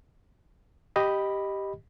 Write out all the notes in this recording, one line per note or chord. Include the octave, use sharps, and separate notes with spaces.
G4 D#5 B5